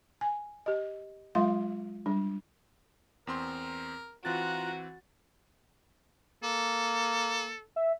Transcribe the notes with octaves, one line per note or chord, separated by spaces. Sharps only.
G#5
G4 D#5
F#3 G#3 F4 E5 F5 C6
G3 D4
E2 C4 A#4 C6
E3 C4 F4 F#4 A#5 F#6 A6
A#3 A4
E5